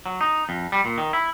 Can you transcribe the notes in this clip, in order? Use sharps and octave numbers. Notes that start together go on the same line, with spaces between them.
F#3
D#4
F2
G3
A#2
D#3
E4